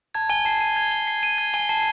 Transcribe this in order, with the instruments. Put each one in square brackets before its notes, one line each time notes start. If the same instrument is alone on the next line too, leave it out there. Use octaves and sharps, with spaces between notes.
[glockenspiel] A5 [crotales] G#6
[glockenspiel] G#5 [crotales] G7
[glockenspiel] A5 [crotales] C7
[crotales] D#7
G#6
G7
C7
D#7
G#6
[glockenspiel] G#5 [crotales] G7
[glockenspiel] A5 [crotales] C7